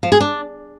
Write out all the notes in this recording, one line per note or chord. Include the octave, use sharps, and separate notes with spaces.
F3
G#4
D4